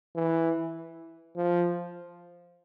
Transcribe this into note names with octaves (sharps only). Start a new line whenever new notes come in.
E3
F3